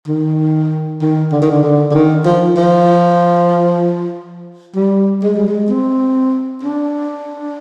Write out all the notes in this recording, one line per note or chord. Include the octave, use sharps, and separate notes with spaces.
D#3
D#3
D3
D#3
D3
D3
D3
D#3
F3
F3
G3
G#3
G3
G#3
C4
D4